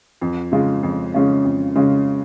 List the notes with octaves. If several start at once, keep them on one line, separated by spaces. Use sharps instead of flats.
F2
C#3 G#3 C#4 F4
F2
C#3 G#3 C#4 F4
F2
C#3 G#3 C#4 F4